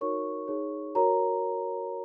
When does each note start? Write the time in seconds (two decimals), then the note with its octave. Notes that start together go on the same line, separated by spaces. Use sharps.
0.01 D#4 F#4 A#4 C#5 C#6
0.48 D#4 G#4 C#5
0.95 F#4 A#4 C#5 A#5